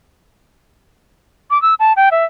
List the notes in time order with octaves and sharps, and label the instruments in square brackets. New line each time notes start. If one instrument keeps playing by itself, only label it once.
[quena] D6
E6
A5
G5
E5